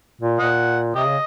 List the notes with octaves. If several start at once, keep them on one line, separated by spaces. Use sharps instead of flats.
A#2
A#2 D#5 F#5
C3 G4 D#5
C#3